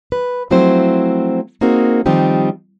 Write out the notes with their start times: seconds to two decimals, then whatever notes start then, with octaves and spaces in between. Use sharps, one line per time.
0.12 B4
0.51 F3 F#3 A3 C4 E4 C5
1.61 A#3 C4 D#4 F#4 G#4 A#4
2.06 D#3 F3 G3 C4 D#4 G4